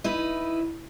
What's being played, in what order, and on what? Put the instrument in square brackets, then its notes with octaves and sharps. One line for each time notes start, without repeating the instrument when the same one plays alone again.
[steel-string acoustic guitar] D#4 E4 B4